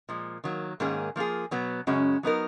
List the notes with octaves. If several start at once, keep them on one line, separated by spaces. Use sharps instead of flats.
A#2 F3 G#3
D#3 F#3 A#3
G#2 D#3 A#3 C#4 G#4
F3 A#3 F4 G#4
B2 F#3 B3
F#2 C#3 G#3 C#4 F#4
F#3 B3 D#4 A#4